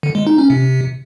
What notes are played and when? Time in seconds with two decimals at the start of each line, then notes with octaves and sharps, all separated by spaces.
0.03 D3
0.15 G#3
0.27 D#4
0.38 C#4
0.50 C3